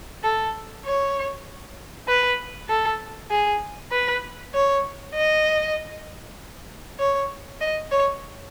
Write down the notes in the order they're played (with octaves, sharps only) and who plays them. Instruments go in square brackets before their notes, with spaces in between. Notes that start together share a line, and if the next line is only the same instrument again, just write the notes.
[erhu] A4
C#5
B4
A4
G#4
B4
C#5
D#5
C#5
D#5
C#5